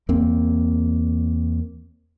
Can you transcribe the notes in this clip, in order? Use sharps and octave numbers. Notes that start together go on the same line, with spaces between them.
E2 A#3 C4